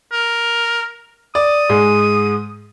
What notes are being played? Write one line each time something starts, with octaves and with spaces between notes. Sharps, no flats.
A#4
D5 D#6
G#2 G#3